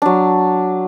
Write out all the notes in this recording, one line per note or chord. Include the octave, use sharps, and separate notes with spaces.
F#3 D4